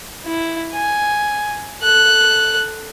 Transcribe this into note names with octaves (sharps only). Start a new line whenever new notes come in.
E4
G#5
A4 F#6